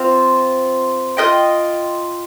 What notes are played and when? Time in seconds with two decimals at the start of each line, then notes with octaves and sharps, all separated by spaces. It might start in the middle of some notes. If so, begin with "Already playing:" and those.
Already playing: C4 F4 C5
1.17 F4 C5 D#5 G5